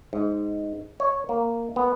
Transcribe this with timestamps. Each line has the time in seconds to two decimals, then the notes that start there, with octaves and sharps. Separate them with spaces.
0.13 G#2
1.00 C#5
1.29 A#3
1.76 B3